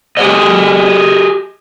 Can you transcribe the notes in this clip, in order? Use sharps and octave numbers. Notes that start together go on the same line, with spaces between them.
G4 G#4 B4 C#5 D#5